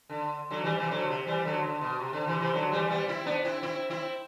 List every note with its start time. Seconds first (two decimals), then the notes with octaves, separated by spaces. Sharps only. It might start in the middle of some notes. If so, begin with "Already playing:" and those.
0.10 D3
0.50 D3 F#3
0.64 E3 G3
0.78 C3 E3
0.91 D3 F#3
1.09 C3
1.27 E3 G3
1.45 D3 F#3
1.64 D3
1.81 B2
2.00 C3
2.13 D3
2.27 C3 E3
2.40 C3 E3
2.54 D3 F#3
2.72 E3 G3
2.90 G3 B3
3.08 C4 E4
3.26 B3 D4
3.45 C4 E4
3.63 C4 E4
3.90 C4 E4